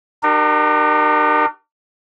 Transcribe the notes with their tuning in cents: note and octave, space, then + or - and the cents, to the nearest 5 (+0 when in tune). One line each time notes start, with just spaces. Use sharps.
D4 +45 G4 -35 A#4 +0